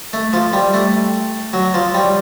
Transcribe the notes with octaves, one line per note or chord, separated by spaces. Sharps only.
A3
F3
G3
A3
F#3
F3
G3